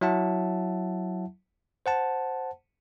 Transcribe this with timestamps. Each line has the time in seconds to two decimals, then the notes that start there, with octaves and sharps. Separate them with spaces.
0.01 F#3 E4 E5 F#5 A5
1.86 C5 F#5 A5